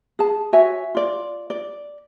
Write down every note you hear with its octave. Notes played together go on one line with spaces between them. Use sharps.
G#4 A5
F#4 C#5 E5 G#5
F4 D5
D5